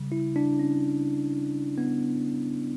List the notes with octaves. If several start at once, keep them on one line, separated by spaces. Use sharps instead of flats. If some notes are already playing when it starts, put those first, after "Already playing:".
Already playing: C#3 G3
E4
D4
C#4
B3